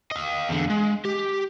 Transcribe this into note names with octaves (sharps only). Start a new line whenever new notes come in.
D#5 F5
E2 D3
G#3
G4